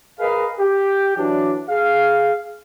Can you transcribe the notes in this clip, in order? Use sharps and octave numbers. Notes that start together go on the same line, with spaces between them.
G#4 A#4 B4 D#5 F5
G4
E3 F#3 D4
G#4 F5